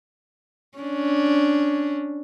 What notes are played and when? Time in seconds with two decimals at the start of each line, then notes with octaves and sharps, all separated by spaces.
0.78 C#4 D4